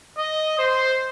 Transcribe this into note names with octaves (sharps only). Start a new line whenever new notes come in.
D#5
C5